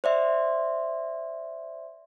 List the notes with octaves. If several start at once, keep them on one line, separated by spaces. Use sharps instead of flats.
C5 D5 E5 C6